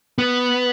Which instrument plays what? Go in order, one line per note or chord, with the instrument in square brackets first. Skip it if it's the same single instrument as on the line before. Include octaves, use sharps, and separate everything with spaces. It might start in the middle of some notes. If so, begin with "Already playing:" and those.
[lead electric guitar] B3